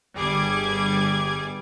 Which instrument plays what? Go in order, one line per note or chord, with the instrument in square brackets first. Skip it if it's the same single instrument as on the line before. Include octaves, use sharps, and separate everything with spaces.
[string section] G1 G3 G#4 D6 G#6